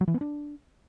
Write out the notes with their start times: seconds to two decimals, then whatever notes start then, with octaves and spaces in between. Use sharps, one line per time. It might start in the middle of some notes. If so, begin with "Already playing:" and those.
0.01 F#3
0.08 E3
0.14 B3
0.21 D4